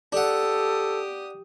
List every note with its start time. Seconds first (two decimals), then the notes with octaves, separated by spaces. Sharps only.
0.12 D4 G4 A4 F#5 D#6